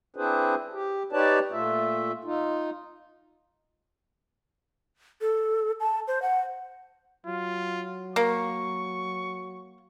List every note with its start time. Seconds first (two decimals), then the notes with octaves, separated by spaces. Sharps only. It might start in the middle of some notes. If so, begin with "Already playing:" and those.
0.16 C4 D4 E4 G#4 B4 C5
0.73 G4
1.12 D#4 G4 B4 C#5 D5 A5
1.52 A#2 A3 F4 E5
2.25 D#4 F4
5.21 A4
5.80 A5
6.07 C5
6.22 F#5
7.26 F#3 F4
8.16 A#3 C#6